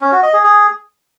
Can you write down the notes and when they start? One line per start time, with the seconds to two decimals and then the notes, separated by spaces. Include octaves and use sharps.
0.01 C#4
0.12 F#4
0.23 D#5
0.33 G#4
0.44 G#4